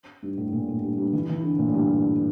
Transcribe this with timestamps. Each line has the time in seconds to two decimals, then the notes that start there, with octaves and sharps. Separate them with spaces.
0.23 G2
0.38 A2
0.53 A#2
0.68 A2
0.83 G2
0.98 G2
1.13 E3
1.29 E3
1.44 D3
1.59 A#2
1.68 A2
1.74 G2